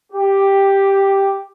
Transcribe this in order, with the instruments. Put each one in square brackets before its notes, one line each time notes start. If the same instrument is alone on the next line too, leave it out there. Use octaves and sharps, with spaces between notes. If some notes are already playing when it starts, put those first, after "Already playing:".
[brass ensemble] G4